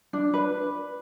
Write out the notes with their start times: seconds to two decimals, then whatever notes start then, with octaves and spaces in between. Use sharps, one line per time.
0.13 D4
0.34 B4